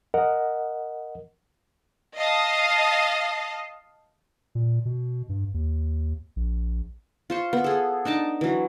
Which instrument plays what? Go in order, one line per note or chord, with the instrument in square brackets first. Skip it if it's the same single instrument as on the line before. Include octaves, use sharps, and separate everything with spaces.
[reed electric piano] A#4 D#5 F#5
[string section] D#5 F5 A5
[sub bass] A#2
B2
G2
D#2
A#1
[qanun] F4 C5 C#6
B3
G#4 A4
D4 D#4 A5 D6
E3 F#3